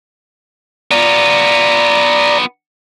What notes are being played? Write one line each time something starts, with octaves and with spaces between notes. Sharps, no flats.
B3 F4 D5 A#5